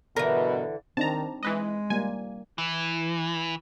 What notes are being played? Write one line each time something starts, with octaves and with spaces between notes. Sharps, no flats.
G2 B2 D3 E3 A#4
D#3 C4 D4 D#4 A5 A#5
E3 G#3 B4 D#5
G3 A#3 G#5
E3